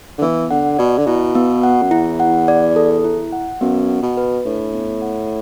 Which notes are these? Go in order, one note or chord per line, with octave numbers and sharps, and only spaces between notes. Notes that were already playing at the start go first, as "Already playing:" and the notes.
D3
E3 B3
D3 F#5
B2 D5
D3
B2 E4
B3
F#5
F#2
E2 E4
F#5
D5
A4
E4
F#5
F#2 B3
F#5
B2
B4
A2 D4
B3
F#5